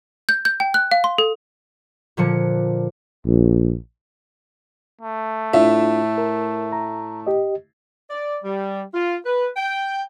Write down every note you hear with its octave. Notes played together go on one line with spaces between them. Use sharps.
G6
G6
G5
F#6
F5
C6
A4
A#2 D3 F3 C#7
A#1
A3
A2 D4 F4 E5
A#4
A#5
G4 D#5
D5
G3
F4
B4
G5